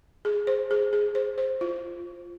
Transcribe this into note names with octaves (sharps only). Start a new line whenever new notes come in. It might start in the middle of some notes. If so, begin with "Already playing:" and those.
G#4
C5
G#4
G#4
C5
C5
F4